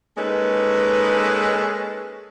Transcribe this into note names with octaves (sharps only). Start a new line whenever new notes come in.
G#3 A#3 C#4 D#4 A4 B4